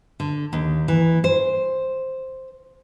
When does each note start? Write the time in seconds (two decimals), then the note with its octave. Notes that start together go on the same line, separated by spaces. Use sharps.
0.20 D3
0.53 D#2
0.88 E3
1.24 C5